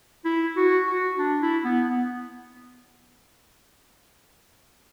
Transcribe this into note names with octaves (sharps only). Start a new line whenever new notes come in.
E4
F#4
F#4
D4
E4
B3
B3